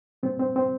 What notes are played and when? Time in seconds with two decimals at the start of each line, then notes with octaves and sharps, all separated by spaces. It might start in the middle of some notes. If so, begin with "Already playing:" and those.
0.23 A#2 G3 C4
0.39 C4
0.56 C4